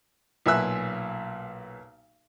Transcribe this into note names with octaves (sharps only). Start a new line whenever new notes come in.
B1 A#2 E5 G#5 E6 F#6